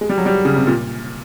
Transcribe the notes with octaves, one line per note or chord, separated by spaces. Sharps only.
G#3
G3
F#3
G3
C#3
C3
A#2